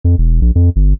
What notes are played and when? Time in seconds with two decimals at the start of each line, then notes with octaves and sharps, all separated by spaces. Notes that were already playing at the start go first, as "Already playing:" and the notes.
0.04 F2
0.18 E1
0.42 A#1
0.55 F2
0.76 G1